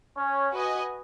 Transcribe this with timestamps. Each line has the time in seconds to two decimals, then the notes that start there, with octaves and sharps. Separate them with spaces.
0.17 C#4
0.53 F#4 B4 D#5 G#5